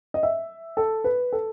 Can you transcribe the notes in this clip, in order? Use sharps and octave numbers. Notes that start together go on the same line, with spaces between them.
D#5
E5
A4
B4
A4